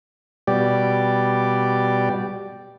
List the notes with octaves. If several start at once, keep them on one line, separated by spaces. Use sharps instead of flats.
B2 G3 G4 D5